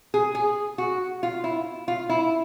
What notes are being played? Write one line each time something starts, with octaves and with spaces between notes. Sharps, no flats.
G#4
G#4
F#4
F4
E4
F4
E4